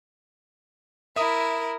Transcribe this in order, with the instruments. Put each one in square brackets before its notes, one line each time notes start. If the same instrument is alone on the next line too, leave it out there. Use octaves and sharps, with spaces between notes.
[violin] E4 A#4 [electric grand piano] E5 D#6